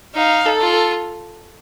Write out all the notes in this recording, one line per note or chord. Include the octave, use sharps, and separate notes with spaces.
D#4 F5
A4
F4